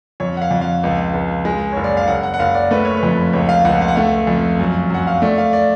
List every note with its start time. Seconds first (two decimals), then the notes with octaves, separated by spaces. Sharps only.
0.20 F2 C#5
0.37 F#5
0.42 F5
0.51 F2
0.61 F5
0.83 C#2
1.14 C#2
1.45 G#3
1.73 F#1 C#5
1.84 D5
1.97 F5
2.08 F#1 F#5
2.23 F#5
2.34 F#5
2.39 F#1 F5
2.55 D5
2.71 A3 B4
2.85 C#5
2.97 B4
3.03 F2
3.33 C#2 C#5
3.49 F5
3.65 C#2 F#5
3.81 F5
3.88 F#5
3.96 A3 F5
4.27 F2
4.60 F#2
4.90 F#2 F#5
5.07 F5
5.22 A3 D5
5.38 F5
5.53 D5